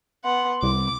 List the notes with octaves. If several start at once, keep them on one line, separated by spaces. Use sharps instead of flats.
B3 F#5 C6
C2 D6